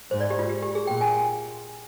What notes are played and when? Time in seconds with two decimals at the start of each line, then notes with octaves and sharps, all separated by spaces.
0.11 G#2 C5
0.21 D5
0.30 G4
0.39 F4
0.49 G4
0.62 G4
0.75 G#4
0.87 A#2 G5
1.01 G#5